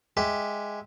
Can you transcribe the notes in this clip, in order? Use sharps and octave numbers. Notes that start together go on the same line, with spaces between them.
G#3 G4 E5